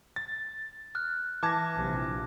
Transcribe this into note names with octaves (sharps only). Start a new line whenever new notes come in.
A6
F6 F#6
E3 A5 D6 G#6 A#6
A#1 C3 F3